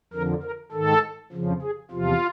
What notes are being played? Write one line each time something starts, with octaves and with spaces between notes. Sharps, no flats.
F2 D3 F3 A#4
A#4
G#2 D#3 A4
F2 C#3 F3
G#4
E2 C3 F3 F4